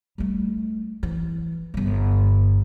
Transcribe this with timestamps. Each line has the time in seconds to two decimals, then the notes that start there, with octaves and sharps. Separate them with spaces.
0.18 G3 A3
1.03 E3
1.74 G1 G2